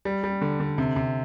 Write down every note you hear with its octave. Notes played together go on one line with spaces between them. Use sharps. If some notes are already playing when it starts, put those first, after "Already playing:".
G3
G3
D3
D3
C3
C3